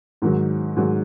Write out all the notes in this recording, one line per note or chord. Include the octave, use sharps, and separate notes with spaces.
G#2 D#3 F#3
G#2 D#3 F#3